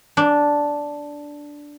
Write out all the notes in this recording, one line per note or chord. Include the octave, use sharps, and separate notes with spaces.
D4